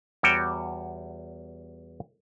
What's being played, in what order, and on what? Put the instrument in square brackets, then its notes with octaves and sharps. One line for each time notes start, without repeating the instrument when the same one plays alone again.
[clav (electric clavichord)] E2 G3 F#4 C#5 G5